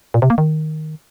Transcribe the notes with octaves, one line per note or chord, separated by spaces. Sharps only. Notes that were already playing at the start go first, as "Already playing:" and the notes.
A#2
C3
A#3
D#3